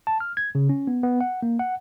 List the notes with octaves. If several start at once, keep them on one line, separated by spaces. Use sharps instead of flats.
A5
F6
G#6
C#3
C#4
B3
B3
F#5
A#3
F#5